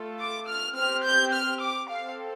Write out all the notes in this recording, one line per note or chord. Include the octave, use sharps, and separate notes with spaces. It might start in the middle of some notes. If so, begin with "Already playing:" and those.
Already playing: A3 F4 A4
D6
F6
C4 G4 F6
G6
F6
D6
C4 A4 F5